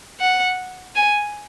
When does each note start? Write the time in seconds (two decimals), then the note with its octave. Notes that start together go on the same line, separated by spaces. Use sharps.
0.20 F#5
0.96 G#5